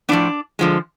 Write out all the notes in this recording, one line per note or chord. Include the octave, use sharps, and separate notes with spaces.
A2 F3 B3 D4 D5
D3 F3 G#3